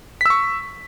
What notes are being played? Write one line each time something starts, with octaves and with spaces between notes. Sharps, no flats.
C#6 E6 B6